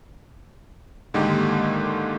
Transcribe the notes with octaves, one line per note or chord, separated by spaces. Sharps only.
G#2 D3 D#3 G#3 A#3 G4